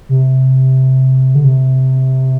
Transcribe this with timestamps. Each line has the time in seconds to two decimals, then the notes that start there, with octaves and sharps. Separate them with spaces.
0.09 C3
1.35 D3
1.44 C3